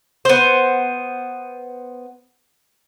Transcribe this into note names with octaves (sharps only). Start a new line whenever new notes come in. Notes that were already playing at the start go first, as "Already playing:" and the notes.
B3 C5